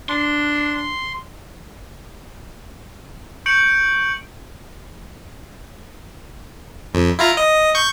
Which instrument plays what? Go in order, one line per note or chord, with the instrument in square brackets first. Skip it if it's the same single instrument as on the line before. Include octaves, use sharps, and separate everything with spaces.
[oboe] D4 [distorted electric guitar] C6
[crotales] C#6 G6 C#7 D7 F#7
[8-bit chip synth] F2
E4 F4 A#5
D#5
C#6 G6